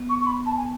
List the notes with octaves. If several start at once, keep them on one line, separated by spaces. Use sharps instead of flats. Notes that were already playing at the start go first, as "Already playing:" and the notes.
Already playing: B3
C#6
C#6
B5
A5
G#5